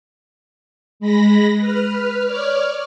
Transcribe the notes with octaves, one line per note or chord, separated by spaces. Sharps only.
G#3 B5 A#6
B4 F6
C#5 D5 F6